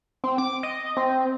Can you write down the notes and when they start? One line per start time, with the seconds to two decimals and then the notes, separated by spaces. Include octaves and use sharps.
0.24 C4
0.38 D6
0.63 D#5
0.97 C4